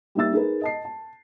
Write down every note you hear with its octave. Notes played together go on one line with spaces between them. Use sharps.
G3 A#3 D#4 E5 E6 A6
D#4 G#4 A#4 B4
D#5 A5 C7
A5